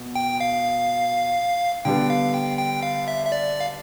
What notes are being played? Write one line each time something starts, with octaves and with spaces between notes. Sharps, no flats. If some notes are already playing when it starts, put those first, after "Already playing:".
Already playing: B2
G5
F5
D3 G3 B3 G5
F5
G5
G5
F5
E5
E5
D5
F5